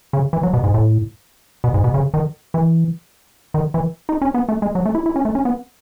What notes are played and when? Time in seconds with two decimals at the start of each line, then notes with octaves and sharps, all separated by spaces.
0.13 C#3
0.33 E3
0.43 F#3
0.53 B2
0.64 G#2
0.74 A2
1.64 B2
1.74 G#2
1.84 B2
1.94 C#3
2.14 D#3
2.54 E3
3.54 D#3
3.74 E3
4.09 D#4
4.21 C#4
4.34 B3
4.49 A3
4.62 G#3
4.75 F#3
4.85 A3
4.95 E4
5.06 E4
5.16 C#4
5.25 A3
5.35 C#4
5.45 B3